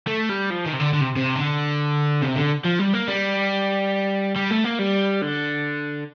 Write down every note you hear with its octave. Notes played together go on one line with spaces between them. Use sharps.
A3
G3
F3
D#3
C3
D3
D3
C3
C3
D3
C3
D3
F3
G3
A#3
G3
G3
A3
A#3
G3
D3